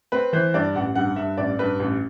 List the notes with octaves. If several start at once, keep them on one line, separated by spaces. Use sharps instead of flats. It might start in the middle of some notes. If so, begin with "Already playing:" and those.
C4 B4
E3 C5
G2 D5
A1 F#5
G2 F#5
G2 E5
A1 D5
G2 B4
A1